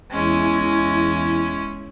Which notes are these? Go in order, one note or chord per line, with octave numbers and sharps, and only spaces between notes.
E2 G#3 C#4 E4